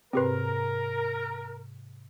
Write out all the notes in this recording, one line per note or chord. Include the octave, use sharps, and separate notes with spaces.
G#2 C3 C4 G4 A#4 B4